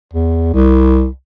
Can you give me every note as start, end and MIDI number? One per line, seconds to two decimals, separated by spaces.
0.13 0.51 40
0.54 1.08 36